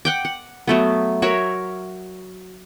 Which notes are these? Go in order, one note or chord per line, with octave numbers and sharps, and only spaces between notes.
F#5 G5 D6
F#5
F#3 A3 B3
F#4 A#4 C#5 E5